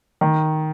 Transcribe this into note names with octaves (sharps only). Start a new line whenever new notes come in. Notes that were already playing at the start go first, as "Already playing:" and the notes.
D#3